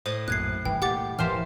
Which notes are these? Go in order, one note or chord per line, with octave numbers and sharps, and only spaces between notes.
A2 C5 D#6
A#1 F#2 A#2 F#6 G#6 C7
F#1 C2 G2 E3 G5
A#2 G4 F#5 D6 A6
E1 A2 E3 F3 A#3 G4 C5 F6